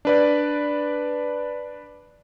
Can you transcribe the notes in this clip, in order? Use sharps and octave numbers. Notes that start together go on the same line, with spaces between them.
D4 B4 D5